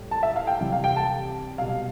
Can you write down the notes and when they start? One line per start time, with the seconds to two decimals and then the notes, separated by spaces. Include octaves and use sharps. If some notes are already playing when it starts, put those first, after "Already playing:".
Already playing: A2 G3
0.11 A5
0.23 E5
0.36 F5
0.47 G5
0.60 C3 E3 G3
0.72 F5
0.84 G5
0.96 A5
1.57 B2 G3 F5